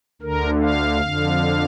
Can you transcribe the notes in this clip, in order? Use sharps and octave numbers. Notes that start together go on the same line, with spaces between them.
D2 D3 A#4
F5
F2 D3